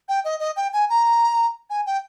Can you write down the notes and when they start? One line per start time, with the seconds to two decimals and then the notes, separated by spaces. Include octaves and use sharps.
0.08 G5
0.24 D#5
0.40 D#5
0.56 G5
0.73 G#5
0.89 A#5
1.70 G#5
1.86 G5